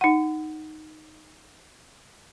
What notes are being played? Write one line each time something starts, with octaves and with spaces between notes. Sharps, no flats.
D#4 F#5